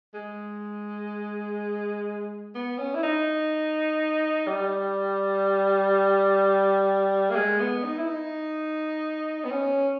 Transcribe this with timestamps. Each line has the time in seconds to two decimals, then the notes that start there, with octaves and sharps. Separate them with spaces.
0.14 G#3
2.55 B3
2.78 C#4
2.94 E4
3.03 D#4
4.47 G3
7.30 A#3
7.36 G#3
7.60 B3
7.84 D#4
7.98 E4
8.08 D#4
9.44 B3
9.51 C#4